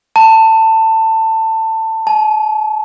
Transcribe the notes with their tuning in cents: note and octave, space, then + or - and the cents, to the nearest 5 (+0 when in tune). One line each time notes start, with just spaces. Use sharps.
A5 +20
A5 -45